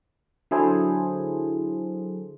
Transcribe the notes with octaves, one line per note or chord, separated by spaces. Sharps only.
D3 F#3 E4 G#4 A4 C5